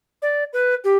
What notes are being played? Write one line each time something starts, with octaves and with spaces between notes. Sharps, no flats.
D5
B4
G4